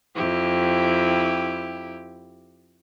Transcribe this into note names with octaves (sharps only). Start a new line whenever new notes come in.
F2 E4 G4